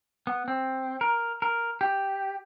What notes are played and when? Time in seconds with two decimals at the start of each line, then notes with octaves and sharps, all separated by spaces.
0.27 B3
0.48 C4
1.01 A#4
1.42 A#4
1.81 G4